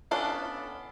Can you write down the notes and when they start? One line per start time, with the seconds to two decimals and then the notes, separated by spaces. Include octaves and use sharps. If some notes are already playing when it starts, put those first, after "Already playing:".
0.11 B3 C#4 D4 A4 F5